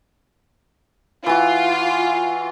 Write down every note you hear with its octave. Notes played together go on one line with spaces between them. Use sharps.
E3 F4 F#4